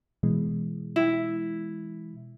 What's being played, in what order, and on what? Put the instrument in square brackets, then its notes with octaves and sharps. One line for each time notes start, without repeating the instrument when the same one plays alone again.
[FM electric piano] B2 E3 G#3
[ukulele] E4